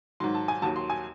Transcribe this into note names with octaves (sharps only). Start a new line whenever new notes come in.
G#2 D#3 F#3 C6
A5
G#5
D#2 D#3 F#3 A5
C6
G#5